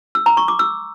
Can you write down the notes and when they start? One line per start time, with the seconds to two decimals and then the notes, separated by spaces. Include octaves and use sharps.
0.15 E6
0.26 A#5
0.37 C#6
0.48 D6
0.59 E6